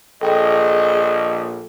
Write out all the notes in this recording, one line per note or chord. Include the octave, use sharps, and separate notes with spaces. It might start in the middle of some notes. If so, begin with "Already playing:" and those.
A#1 G#4 A4 D#5 G5